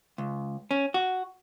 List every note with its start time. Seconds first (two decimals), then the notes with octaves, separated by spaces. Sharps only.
0.18 C#2
0.71 C#4
0.94 F#4